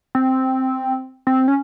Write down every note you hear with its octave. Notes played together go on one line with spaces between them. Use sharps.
C4
C4
C#4